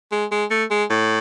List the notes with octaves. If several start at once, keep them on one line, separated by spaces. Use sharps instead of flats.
G#3
G#3
A3
G#3
A2